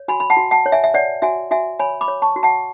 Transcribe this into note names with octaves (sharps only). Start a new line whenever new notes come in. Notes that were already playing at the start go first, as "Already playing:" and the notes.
Already playing: C#5
F#4 G#5 B5
B5
F#5 A5
F#4
F#5 A5
C#5
E5 G#5
E5
C#5 D5 F#5
F#4 E5 G#5
F#4 E5 G#5
C#5 G#5 B5
B5 D6
C#5
A5 C#6
F#4
F#5 A5